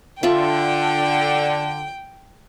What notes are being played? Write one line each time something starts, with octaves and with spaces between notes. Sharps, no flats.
D3 F4 D5 E5 G5